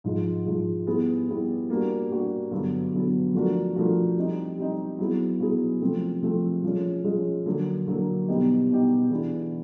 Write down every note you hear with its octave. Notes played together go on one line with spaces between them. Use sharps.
G#2 F3 G#3
G#2 F3 G#3
G3 B3 E4 G#4
G3 B3 E4 G#4
G3 A#3 D4 F#4
G3 A#3 D4 F#4
G2 D3 F#3 B3
G2 D3 F#3 B3
F3 A3 D4 F#4 A#4
F3 A3 D4 F#4 A#4
G3 C4 D#4
G3 C4 D#4
F#3 B3 E4 G#4
F#3 B3 E4 G#4
C3 F3 A3 C4
C3 F3 A3 C4
F3 G#3 C#4
F3 G#3 C#4
D3 F#3 A#3
D3 F#3 A#3
B2 G3 B3 D#4 G4
B2 G3 B3 D#4 G4
E3 G#3 B3 D4